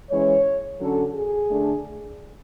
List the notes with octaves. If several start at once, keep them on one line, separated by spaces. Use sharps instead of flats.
E3 G#3 C#4 C#5
D3 F#3 C#4 A4
G#4
D3 A3 D4